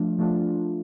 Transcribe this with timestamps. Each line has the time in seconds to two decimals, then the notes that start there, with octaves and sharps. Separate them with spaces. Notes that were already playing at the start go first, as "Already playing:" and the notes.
Already playing: F3 A3 D4 F4
0.18 F3 A3 D4 F4